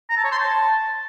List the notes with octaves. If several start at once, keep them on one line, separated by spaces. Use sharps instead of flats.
A#5
A5
C#5
C6
A5